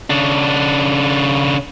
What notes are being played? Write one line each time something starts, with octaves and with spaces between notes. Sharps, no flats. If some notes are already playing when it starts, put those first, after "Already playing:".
C#3 D4